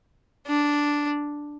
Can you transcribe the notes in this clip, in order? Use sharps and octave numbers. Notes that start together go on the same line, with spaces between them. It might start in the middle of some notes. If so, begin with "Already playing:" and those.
D4